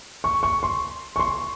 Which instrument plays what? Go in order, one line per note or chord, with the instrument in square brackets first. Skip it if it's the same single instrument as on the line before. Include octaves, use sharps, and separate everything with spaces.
[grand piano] C#6
C#6
C6
C#6
C6